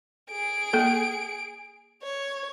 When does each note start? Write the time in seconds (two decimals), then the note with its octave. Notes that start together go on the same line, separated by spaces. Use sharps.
0.30 G#4 D7
0.73 A#3 A4
2.03 C#5